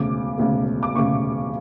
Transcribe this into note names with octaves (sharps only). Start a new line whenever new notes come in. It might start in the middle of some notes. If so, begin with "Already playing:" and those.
Already playing: E1 D2 C#3 D6
E1 D2 C#3
D6
E1 D2 C#3 C#6